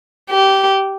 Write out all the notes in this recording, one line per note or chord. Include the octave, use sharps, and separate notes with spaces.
G4